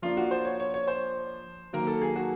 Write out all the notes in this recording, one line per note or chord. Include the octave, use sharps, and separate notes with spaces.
F3 A#3 D4 F4
F#4
C5
C#5
C#5
C#5
C5
D#3 F#3 A#3 A#4
A4
G#4
F#4